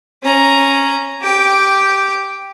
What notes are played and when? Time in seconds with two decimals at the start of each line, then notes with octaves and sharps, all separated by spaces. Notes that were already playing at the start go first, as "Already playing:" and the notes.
0.23 C#4 A#5
1.21 G4 G5